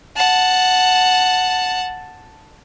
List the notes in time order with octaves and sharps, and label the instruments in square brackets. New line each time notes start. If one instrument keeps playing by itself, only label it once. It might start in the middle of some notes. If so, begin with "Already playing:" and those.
[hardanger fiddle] F#5 A5